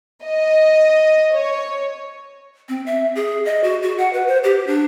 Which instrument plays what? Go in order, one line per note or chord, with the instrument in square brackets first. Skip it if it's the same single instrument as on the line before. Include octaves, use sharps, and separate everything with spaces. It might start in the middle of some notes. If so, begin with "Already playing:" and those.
[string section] D#5
C#5
[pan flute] C4
E5
G#4
D#5
F#4
F#4
F#5
B4
C5
G4
D4